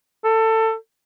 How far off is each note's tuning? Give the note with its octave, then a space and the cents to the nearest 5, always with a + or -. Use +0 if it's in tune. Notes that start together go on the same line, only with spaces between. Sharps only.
A4 +20